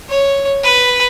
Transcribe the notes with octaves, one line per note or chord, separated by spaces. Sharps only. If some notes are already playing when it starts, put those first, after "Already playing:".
C#5
B4